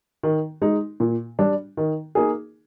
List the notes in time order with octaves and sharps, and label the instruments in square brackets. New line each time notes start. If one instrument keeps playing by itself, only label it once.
[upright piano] D#3
G#3 D#4
A#2
G3 D4
D#3
A#3 D#4 G#4